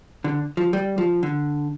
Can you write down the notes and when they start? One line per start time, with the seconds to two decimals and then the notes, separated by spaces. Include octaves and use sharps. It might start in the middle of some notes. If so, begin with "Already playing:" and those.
0.24 D3
0.57 F3
0.73 G3
0.98 F3
1.23 D3